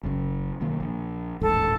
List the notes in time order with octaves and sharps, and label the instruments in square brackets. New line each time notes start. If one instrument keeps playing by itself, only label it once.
[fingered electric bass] F#1 F#2 C#3
B1 D#3 A#3
A#1
[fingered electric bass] D#1 A1 G#2 [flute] A4